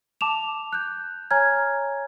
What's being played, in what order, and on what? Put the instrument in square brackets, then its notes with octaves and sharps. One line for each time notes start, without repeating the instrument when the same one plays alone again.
[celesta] A5 D6 E7 F7
F#6 G6
C#5 G#5 A#5 F6 G#6